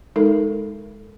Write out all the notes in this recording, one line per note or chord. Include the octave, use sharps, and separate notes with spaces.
G#3 D#4 A4 A#4